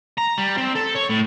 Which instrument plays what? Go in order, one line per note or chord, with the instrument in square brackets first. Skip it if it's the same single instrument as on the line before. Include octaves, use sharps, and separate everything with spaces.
[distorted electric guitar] A#5
G3
C4
A4
C#5
A2